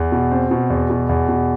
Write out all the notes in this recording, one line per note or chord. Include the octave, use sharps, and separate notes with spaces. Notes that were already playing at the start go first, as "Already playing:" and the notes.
Already playing: E2
B2
C4
B2
E2
B2
E2
B2